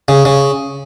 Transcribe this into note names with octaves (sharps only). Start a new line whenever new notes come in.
C#3
C#3